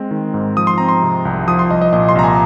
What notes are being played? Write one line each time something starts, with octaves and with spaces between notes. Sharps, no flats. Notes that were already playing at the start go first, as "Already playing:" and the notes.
Already playing: G#3 C4
D#3
G#2
F3 D#6
C6
C4 A#5
C6
C3
C2
F3 D#6
C6
C2 D#5
D#5
A#2 D#5
C6
C2 A#5
G#5